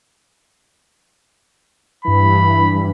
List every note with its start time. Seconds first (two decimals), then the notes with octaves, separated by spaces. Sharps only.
2.05 G2 E3 B5